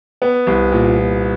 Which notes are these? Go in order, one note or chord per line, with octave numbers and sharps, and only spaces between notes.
B3
C2
A#2
A#2